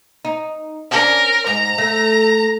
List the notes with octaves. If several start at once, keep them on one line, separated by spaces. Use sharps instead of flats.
D#4
C#4 D4 A#4
G#2 A#5
A3